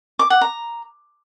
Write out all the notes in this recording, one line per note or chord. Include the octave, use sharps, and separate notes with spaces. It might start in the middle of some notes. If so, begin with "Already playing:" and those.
D6
F#5
A#5